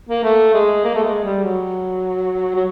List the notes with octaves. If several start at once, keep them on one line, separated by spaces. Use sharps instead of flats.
A#3
A3
G#3
A#3
A3
G#3
G3
F#3
F#3